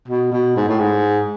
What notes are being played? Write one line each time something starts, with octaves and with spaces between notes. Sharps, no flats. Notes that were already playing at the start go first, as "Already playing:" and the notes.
B2
B2
G#2
A2
G#2